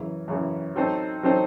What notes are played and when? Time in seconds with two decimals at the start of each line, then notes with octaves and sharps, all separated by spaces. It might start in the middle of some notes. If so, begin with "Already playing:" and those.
Already playing: F#2 C#3 E3
0.28 F#2 C#3 E3
0.75 F#3 C4 D#4 A4 C5
1.23 F#3 C4 D#4 A4 C5